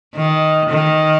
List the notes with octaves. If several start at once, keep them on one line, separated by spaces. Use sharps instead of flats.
D#3
D#3